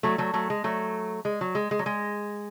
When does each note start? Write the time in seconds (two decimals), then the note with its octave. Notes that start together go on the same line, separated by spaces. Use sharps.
0.03 F#3 A3
0.18 F#3 A3
0.34 F#3 A3
0.50 G#3
0.64 F#3 A3
1.25 G#3
1.41 F#3
1.55 G#3
1.71 G#3
1.79 F#3
1.86 G#3